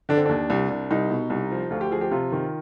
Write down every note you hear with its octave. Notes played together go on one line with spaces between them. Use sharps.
D3 D4
C4
D#2 D4
C2
C2
C2 D#4
B2
C2
F3
D2 F4
G4
F3 G#4
G4
C3 F4
D#3